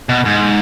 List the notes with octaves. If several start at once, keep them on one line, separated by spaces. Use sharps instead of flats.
B2
G#2